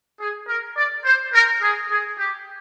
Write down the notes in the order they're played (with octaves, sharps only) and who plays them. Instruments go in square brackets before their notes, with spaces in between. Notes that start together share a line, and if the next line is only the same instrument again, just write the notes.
[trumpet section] G#4
A#4
D5
C5
A#4
G#4
G#4
G4